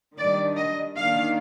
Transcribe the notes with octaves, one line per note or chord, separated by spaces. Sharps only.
D#3 G3 D4 D5
D#5
D#3 A#3 D4 F5